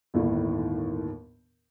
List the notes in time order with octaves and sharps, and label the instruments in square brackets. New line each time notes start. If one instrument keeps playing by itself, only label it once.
[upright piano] G1 D#2 A2 D#3